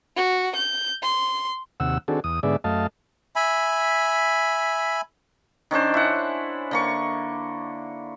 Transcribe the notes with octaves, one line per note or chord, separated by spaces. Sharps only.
F#4
G6
C6
D#2 C3 F#5 E6
D#3 C4 D4 F#4 G#4 A4
E2 D#6
G#2 D3 B3 G#4 D5 E5
F#2 A3 D#5 F5 A5
E5 G#5 B5
D#3 C#4 D4 C5
E4 F#5
D3 A#3 C#6